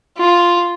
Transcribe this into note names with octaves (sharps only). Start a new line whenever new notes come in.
F4